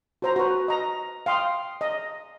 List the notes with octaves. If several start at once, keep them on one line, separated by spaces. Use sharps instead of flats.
F#4 C5 A#5
F#4 B4
D#5 A#5
F5 G5 C6 D#6
D#5